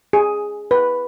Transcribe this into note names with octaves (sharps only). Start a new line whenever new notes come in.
G#4
B4